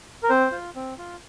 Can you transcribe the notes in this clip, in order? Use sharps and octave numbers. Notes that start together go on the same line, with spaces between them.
A#4
C4 C5
F4
C4
F4